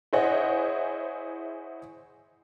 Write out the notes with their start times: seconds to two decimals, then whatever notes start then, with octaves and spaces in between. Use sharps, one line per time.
0.13 E4 G#4 C5 C#5 D#5 F#5